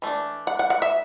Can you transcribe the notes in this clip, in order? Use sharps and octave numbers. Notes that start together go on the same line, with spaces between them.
E3 A3 D4
F#5
F#5
F#5
E5